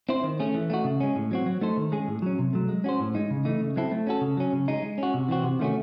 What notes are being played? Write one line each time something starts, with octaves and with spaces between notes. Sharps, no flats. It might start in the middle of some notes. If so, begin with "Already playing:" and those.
C4 E4 C5
D#3
A3 C#4 G#4
E3
A3 C4 D#4 F#4
C#3
G#3 C#4
A2
F#3 C4 F#4
F#3
A3 D#4 A4 C5
D#3
G#3 C#4 G#4
A2
F#3 C#4
C3
F#3 A3
G#3
C#4 F#4 C5
A2
G#3 D#4
C#3
E3 A3 D#4
C#3
F#3 C4 E4 A4
A3
C#4 F#4 A4
C#3
F#3 C#4
C#3
G#3 D#4
G#3
C#4 F#4
C3
E3 C4 F#4
C3
D#3 A3 C#4 F#4